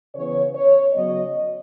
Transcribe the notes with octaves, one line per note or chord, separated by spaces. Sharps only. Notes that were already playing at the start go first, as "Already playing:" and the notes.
C#3 E3 B3 C#5
C#5
C#3 F#3 B3 D#5